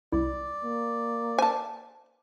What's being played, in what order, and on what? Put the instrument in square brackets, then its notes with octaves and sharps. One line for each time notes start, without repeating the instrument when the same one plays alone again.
[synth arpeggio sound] C2 E4 [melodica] D5
[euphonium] A#3
[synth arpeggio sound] C5 [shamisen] G#5 A5